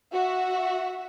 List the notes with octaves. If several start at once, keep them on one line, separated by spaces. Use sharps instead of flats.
F#4 E5